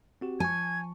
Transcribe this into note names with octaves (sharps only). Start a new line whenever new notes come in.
C4 F#4 G4
F3 G#5 A5 C#6 G#6